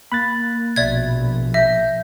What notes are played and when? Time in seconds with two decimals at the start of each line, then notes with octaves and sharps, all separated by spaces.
0.12 A#3 B5 F#6 A6
0.76 A#1 B2 D5 E5 G#6
1.54 E5 G6 A#6